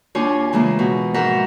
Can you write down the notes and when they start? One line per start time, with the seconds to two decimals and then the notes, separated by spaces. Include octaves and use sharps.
0.15 D#2 D4 F4 C#5 G#5
0.53 C#3 E3 G#3 A#3
0.79 B2
1.14 G#2 F3 A#4 E5 F#5